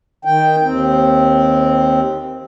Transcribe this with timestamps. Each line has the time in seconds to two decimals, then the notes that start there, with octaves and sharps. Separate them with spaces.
0.25 D#3 G5
0.62 D#2 C4